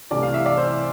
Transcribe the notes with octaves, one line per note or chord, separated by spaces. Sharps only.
C2 C3 E3 A3 D5
F5
E5
D5
C5